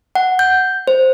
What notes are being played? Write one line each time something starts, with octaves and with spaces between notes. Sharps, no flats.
F#5
G6
C5